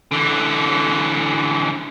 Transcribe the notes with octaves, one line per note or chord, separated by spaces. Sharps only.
D3 E3